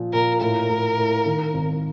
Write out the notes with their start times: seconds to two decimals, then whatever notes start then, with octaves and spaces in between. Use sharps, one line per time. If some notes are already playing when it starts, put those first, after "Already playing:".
Already playing: A#2 F3
0.13 A#2 A#4
0.41 A2 A#4
0.70 A2
0.98 A2
1.26 D#3
1.54 G#1